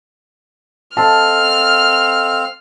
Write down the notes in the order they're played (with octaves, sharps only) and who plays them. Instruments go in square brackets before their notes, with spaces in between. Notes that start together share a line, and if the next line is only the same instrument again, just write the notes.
[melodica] C4 F5 [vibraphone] A4 D#5 [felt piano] A5 [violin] F6